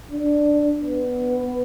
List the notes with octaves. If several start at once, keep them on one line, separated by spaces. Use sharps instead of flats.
D4
B3